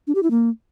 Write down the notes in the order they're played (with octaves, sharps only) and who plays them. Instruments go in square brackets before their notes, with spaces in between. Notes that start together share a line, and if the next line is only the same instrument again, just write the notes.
[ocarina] D4
G4
E4
A#3